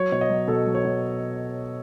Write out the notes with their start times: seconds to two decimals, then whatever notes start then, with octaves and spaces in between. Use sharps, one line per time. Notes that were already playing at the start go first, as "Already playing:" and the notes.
Already playing: F#3 C#5
0.12 B2 C#5
0.21 D#5
0.30 F#3
0.48 B2 A4
0.66 F#3
0.75 C#5
0.85 B2